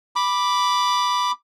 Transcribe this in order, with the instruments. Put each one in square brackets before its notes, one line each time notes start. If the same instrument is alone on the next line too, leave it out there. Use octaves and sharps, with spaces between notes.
[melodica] B5 D6